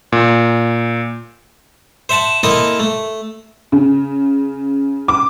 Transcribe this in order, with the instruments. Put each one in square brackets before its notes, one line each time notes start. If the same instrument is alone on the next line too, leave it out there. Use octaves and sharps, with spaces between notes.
[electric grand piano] A#2
[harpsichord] C5 E5 F#5 A5
A#3 C4 E4 A4 D#5
A3
[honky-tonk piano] C#3
D6